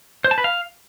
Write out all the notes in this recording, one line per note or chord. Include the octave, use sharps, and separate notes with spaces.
C5
A5
B4
F5